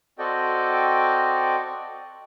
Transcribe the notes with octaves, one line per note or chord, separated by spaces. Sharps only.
C4 F#4 A4 D5 D#5 G5